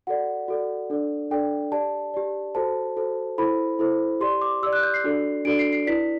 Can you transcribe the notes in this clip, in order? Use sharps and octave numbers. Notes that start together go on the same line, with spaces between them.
F#4 A4 D5 F#5
F#4 A4 D5
D4 A4 D5
D4 A4 D5 G5
G4 D5 A5
G4 D5
F#4 A4 C5 A5
F#4 A4 C5
E4 A4 C5 B5
E4 A4 C5
G4 D5 C6
D6
G4 D5 E6
F#6
G6
C7
D4 F#4 A4 D5
D4 F#4 A4 D5 D7
C7
C7
E4 B4 D5 B6